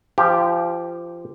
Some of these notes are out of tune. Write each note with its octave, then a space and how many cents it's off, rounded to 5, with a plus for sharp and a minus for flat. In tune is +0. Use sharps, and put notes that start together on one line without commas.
F3 -25 G4 +0